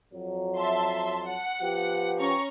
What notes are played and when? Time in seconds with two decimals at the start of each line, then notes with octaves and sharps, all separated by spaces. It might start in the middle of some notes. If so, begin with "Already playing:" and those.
0.13 F2 F#3
0.56 E5 A5 C6
1.26 F#5
1.61 F3 B3 G4
2.19 C#4 A#5 C#6